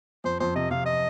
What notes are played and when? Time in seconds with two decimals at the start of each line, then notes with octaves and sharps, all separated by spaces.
0.24 F2 C5
0.40 F2 C5
0.55 C3 D#5
0.71 C3 F5
0.86 D#5